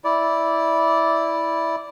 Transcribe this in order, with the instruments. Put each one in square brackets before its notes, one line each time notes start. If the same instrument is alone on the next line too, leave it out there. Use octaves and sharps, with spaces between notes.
[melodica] E4 D5